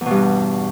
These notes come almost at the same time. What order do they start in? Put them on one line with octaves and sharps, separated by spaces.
E2 B2 G2